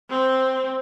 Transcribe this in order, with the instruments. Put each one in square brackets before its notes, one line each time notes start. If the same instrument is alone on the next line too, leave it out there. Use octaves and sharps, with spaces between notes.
[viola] C4